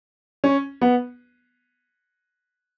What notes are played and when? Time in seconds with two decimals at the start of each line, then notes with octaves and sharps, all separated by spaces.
0.44 C#4
0.82 B3